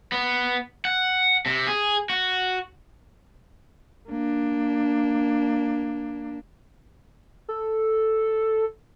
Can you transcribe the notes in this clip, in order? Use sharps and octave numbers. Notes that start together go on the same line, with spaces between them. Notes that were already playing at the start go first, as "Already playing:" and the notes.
B3
F#5
C3
G#4
F#4
A#3 D4
A4